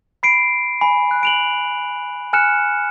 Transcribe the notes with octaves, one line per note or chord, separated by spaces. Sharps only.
B5 C7 D7
G#5 B5
F#6
D7 F7 F#7
G#5 F6 F#6 C#7 E7